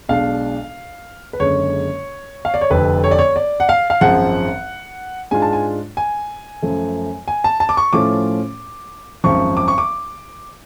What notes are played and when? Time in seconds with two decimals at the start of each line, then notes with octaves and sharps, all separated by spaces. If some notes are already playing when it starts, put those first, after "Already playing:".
0.09 B1 B2 G#3 D4 F5
1.33 B4
1.39 F#1 F#2 D3 G#3 C#5
2.45 F5
2.54 D5
2.61 C#5
2.70 F1 F2 D3 B4
3.04 C#5
3.11 D5
3.19 C#5
3.36 D5
3.60 F#5
3.69 F5
3.90 F5
4.01 G#1 F#2 F3 G#3 F#5
5.31 G#2 G#3 D4 F4 G#5
5.42 A5
5.53 G#5
5.97 G#5
6.62 F#2 F3 A3
7.28 G#5
7.44 A5
7.60 A5
7.69 D6
7.77 C#6
7.93 A2 F3 A3 C#4 F4 D6
9.24 G#1 F#2 F3 C#6
9.57 D6
9.68 C#6
9.78 D6